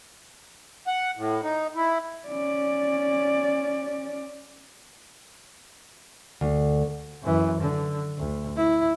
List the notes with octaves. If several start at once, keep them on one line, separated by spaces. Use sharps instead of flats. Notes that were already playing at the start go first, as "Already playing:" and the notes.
F#5
A2
D#4
E4
C#4 D5
D2
F#2 E3
D3
D2
E4